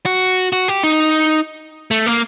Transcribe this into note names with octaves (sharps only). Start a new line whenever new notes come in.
F#4
F#4
G4
D#4
A3
A#3